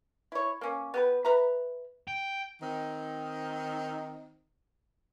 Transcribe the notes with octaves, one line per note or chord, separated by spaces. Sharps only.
E4 C#5
A#3 C#4
B3 G4 B4
B4 E5 A#5
G5
D#3 C4 D#4